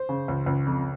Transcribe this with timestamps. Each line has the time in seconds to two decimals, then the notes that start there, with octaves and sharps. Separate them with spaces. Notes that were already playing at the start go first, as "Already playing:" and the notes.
Already playing: C5
0.09 C#3
0.28 C#2
0.46 C#2
0.67 F2